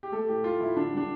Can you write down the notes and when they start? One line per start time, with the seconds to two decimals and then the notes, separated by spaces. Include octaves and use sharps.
0.03 G4
0.12 A3 A4
0.28 A2 G4
0.44 A2 F4
0.60 F3 E4
0.76 D3 D4
0.93 G3 D4